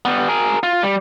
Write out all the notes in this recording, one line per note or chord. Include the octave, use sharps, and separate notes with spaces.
G3 B3
G#4 A#4
F4
G3